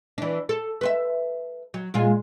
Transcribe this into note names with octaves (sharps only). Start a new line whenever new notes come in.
E3 D4
A4
B4 C5 E5
F#3
A#2 G#3 F4